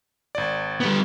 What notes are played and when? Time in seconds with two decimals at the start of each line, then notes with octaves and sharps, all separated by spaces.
0.35 G#1 D5
0.80 G3 B3